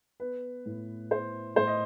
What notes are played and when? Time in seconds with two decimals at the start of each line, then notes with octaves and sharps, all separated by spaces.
0.20 B3 B4
0.66 A2
1.11 E4 C5
1.56 A2 C5
1.67 D#5